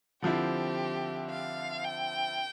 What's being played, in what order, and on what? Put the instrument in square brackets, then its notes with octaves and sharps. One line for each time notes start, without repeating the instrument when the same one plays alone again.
[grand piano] D3 F3 C4 E4 [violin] G4
[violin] F5
G5